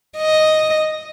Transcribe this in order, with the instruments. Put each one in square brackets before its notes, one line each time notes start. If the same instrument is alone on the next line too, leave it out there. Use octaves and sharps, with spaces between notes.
[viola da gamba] D#5